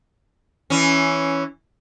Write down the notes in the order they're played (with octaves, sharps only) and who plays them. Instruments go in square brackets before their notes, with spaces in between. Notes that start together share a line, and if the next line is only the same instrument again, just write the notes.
[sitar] E3 C#4